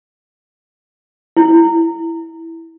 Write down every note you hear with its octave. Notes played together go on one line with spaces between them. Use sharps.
E4